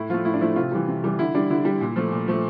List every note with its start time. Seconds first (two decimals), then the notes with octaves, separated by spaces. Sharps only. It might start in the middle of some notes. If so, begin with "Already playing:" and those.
Already playing: A2 E4
0.10 F3 A3 F4
0.25 A2 E4
0.34 D4
0.41 F3 A3 E4
0.56 C3 F4
0.72 E3 G3
0.88 C3
1.04 E3 G3
1.19 D3 E4
1.35 G3 D4
1.50 D3 E4
1.65 G3
1.81 A#2
1.96 F3 A3
2.12 A#2
2.28 F3 A3